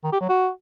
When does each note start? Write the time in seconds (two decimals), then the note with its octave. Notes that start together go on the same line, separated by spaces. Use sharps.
0.04 D#3
0.13 G4
0.21 F#3
0.29 F#4